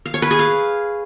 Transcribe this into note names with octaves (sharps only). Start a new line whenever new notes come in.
F5
C#5
B4
G#4
F5